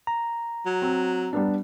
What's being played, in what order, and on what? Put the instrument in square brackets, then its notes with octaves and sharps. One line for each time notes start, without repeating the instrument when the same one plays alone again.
[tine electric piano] A#5
[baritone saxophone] F#3
[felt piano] C4
G3 B3 D4